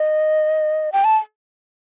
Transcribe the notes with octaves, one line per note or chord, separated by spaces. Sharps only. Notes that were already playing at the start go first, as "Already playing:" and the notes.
Already playing: D#5
G5
A5